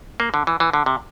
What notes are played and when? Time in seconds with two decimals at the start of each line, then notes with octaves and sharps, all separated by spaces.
0.20 A#3
0.34 D3
0.47 E3
0.60 E3
0.73 D3
0.86 C3